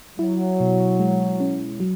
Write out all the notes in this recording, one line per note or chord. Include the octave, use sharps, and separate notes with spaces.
F#3 E4
B2
G#3
C#4
F#3